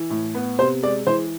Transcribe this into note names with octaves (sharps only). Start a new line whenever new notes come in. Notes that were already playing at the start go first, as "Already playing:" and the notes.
Already playing: E3
A2
B3
C3 C5
G#3 D5
E3 C5